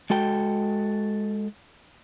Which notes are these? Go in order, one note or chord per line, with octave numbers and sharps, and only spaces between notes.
G#3 F#4 A4 G5